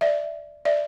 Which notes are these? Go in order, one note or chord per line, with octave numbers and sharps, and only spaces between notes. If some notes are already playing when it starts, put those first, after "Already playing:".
D5 E5
D5 E5